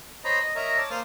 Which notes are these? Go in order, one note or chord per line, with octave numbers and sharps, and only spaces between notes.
C5 C#5 D#5 A#5 B5
D#5
A#4 C#5 D#5 E5 A#5
C#5 D5 A5
A#3 C5 F5 D#6 F6